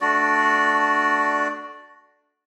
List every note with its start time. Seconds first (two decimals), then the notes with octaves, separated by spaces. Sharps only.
0.01 A3 D4 F#4 D5